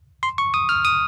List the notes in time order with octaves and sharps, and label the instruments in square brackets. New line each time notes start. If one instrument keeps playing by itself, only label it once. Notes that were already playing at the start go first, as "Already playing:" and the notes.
[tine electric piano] C6
C#6
D#6
F6
D#6